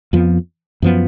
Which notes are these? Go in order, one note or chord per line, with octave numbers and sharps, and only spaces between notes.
F2 F3 B3
F#2 F3 B3